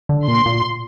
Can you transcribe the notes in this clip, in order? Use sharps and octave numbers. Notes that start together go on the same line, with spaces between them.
D3
A#2 C6
A#2